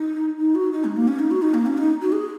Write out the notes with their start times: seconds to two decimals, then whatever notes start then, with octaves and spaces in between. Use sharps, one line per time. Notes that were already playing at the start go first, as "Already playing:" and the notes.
Already playing: D#4
0.38 D#4
0.55 F#4
0.72 D#4
0.85 G#3
0.97 A#3
1.08 C#4
1.19 D#4
1.31 F#4
1.42 D#4
1.54 A#3
1.66 C#4
1.78 D#4
2.02 F#4
2.12 G#4